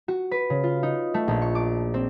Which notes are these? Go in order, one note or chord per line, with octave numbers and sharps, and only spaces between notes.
F#4
B4
C#3
F4
D#4
A3
A#1
C#6
D6
C4